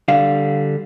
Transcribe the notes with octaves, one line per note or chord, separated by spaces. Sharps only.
D3 G3 F5